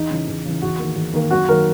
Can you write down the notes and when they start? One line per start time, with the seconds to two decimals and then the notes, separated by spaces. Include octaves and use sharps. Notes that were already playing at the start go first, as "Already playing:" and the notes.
Already playing: E2 D#4
0.11 C#3 E3
0.27 E2
0.45 C#3 E3
0.62 E2 F#4
0.79 D#3 A#3
0.96 E2
1.13 D#3 A#3
1.31 F#2 F#4
1.48 D#3 F#3 A#3 A#4